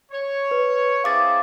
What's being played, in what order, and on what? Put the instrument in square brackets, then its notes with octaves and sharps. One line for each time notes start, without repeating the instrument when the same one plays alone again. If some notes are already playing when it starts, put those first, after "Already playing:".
[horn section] C#5
[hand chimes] B4
[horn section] C4 E4 G#4 [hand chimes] F5 D6 A6